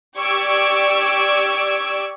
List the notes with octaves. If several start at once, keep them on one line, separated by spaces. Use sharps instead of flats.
G4 D5 C#6 E6 G#6 D7